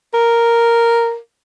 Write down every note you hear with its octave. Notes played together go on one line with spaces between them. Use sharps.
A#4